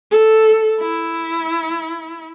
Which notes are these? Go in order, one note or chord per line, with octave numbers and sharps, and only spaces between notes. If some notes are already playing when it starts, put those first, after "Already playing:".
A4
E4